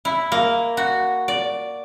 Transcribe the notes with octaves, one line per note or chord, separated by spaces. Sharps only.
E4
A#3
F#4
D5